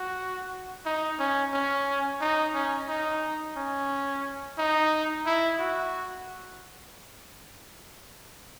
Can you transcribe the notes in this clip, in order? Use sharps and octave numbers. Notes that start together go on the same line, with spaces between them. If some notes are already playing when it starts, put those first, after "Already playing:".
Already playing: F#4
D#4
C#4
C#4
D#4
C#4
D#4
C#4
D#4
E4
F#4